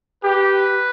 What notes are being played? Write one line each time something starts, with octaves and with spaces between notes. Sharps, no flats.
G4 B4